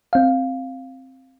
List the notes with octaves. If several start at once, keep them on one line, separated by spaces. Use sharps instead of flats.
C4 F5